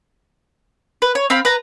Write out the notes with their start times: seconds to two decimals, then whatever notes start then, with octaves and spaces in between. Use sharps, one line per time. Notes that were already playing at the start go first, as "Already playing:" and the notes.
1.02 B4
1.15 C#5
1.30 C4 F5 B5
1.45 B4 A#5